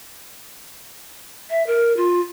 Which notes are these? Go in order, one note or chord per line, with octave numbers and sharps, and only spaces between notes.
E5
A#4
F4